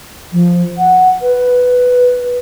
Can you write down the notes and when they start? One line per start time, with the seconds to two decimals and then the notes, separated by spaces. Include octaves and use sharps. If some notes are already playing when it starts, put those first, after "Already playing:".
0.32 F3
0.78 F#5
1.22 B4